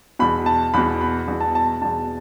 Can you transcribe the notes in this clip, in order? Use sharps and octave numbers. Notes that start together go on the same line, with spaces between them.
E2 B2 B5
A5
E2 B2 B5
B5
E2 B2
A5
A5
E2 B2 A5